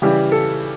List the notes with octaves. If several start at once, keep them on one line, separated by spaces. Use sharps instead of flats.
C#3 E3 G3 G4
A4